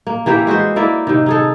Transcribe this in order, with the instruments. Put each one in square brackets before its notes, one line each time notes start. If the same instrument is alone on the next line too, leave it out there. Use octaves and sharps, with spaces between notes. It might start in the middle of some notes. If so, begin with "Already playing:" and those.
[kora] A#3
E3 A#3 G4 E5
G#3 F#4 B4 C5
A#3 E4 D5 E5
C3 D#3
D#4 G#4 A4